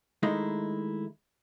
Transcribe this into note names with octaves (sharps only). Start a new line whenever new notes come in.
D#3 G#3 A3 D#4 E4